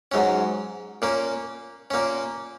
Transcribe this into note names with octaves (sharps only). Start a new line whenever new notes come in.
G#2 F#3 C#4
A#2 A#3 C#4
A#2 A#3 C#4